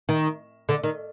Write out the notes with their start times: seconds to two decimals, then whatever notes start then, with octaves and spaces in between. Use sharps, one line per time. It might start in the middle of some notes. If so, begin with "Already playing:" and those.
0.09 D#3
0.69 D3
0.84 D#3